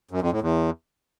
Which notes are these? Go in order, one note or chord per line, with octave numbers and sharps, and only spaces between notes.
F#2
F2
A2
E2